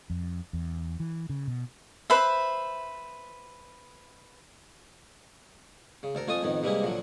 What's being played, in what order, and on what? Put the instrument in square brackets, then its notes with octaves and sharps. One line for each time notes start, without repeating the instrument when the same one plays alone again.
[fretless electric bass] F2
E2
E3
C#3
B2
[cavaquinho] B4 C5 E5
[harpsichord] C#3
D2 A4 A#4
F2 A3 F4 A4 G#5 D#6
F2 A2 D#3 B3
C3 E3 G3 G#3 A#3 E4
A#2 D3 F3 F#3